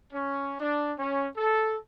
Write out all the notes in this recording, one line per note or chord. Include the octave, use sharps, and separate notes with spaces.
C#4
D4
C#4
A4